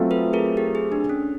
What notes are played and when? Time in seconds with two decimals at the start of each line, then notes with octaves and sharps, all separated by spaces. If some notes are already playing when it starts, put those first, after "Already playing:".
Already playing: F#3 A3 C4 F4
0.11 A4 B4
0.33 G#4 A#4
0.57 G4 A4
0.75 G#4
0.92 D4
1.09 C#4